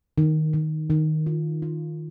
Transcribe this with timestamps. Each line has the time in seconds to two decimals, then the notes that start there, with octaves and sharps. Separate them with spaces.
0.18 D#3
0.53 D#3
0.90 D#3
1.26 F4
1.62 F4